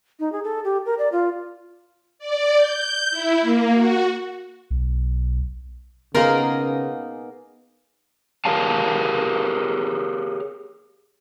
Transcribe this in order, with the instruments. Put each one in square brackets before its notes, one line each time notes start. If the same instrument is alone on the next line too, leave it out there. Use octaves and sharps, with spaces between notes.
[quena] D#4
G#4
A4
G4
A#4
D5
F4
[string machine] D5
G6
E4
A#3
F#4
[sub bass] B1
[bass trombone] C#3 [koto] A#3 D#4 F4 [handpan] B3 G#4 [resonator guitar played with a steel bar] A#4
[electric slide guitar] G4 G#4 A#4 C#5 F5 A5